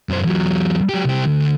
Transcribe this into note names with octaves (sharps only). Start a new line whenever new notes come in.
F#2 C5
E2 F#3
F#3 G4
C2 G4
D2